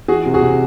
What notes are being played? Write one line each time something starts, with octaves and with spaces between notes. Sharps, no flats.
E3 F#4 G#4
C3
F#4 G#4
C3